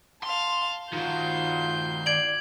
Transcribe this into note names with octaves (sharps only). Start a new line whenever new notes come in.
F5 A5 C6
D#3 F4 F#4 G6 C7
D5 G#6 D7 F#7